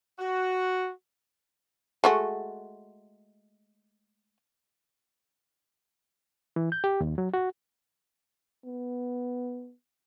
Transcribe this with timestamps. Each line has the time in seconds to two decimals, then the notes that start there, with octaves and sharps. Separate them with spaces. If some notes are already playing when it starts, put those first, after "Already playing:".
0.19 F#4
2.04 G#3 A3 F#4
6.56 E3
6.72 G6
6.84 G4
7.01 D#2
7.18 F#3
7.34 F#4
8.65 B3